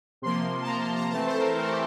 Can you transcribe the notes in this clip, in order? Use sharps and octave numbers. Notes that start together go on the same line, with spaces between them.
C3 F3 A#3 C6
A5
C3 F3 A#3 A#5
C6
A#5
E3 A3 C4 A5
C5
A4
A#4
E3 A3 C4 A#4
A4
G4